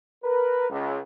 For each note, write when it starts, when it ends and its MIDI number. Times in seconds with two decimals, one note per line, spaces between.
0.23 0.68 70
0.23 0.68 71
0.70 0.96 37